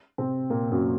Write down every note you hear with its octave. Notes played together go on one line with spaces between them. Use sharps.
C3 C4
A#2 A#3
F#2 F#3